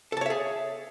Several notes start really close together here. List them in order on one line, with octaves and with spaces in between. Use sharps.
A4 A5 C#5 E5 G#4